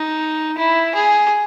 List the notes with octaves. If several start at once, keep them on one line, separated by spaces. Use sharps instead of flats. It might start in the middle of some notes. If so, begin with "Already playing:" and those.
Already playing: D#4
E4
G#4